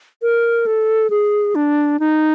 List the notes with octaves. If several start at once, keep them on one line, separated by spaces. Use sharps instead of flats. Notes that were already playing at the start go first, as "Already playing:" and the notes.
A#4
A4
G#4
D4
D#4